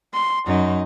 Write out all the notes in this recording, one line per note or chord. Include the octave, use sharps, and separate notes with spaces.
C6
F#2 D#4